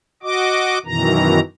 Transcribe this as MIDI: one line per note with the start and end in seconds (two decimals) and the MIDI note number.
0.23 0.78 66
0.23 0.78 75
0.23 0.78 86
0.85 1.40 42
0.85 1.40 47
0.85 1.40 51
0.85 1.40 52
0.85 1.40 82